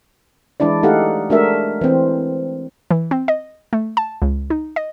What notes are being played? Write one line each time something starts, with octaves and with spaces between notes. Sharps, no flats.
E3 G#3 D4 E4 D5
A3 D#4 G4 A4 F5 F#5
G#3 A3 D4 F#4 A#4 E5
E3 C4
E3
C4
D#5
A3
A5
C#2
D#4
D#5